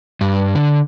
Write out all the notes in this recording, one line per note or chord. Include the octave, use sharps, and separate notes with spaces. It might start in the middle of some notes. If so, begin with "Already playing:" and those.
G2
D3